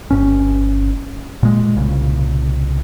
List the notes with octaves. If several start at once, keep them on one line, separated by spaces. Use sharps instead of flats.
G1 G2 C#4
A#2 G#3
C2 A#2 C#3